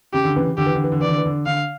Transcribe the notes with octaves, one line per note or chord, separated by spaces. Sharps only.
C#3 G4
D3
C#3 E3
D3 G4
E3
D3
E3
D3
E3 D5
D3
E3
D3
D3 F5